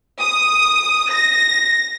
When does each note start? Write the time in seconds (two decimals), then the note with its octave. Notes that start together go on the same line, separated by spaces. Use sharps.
0.20 D#6
1.11 A#6